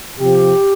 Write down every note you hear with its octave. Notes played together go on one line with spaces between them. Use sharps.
C3 F3 G4